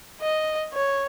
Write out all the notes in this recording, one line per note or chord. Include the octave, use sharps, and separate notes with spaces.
D#5
C#5